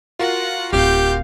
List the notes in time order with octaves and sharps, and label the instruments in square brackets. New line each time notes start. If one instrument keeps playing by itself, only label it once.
[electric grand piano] F4 F#4 A#4 [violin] F#5
[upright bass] D1 [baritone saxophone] G4 [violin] F5 G6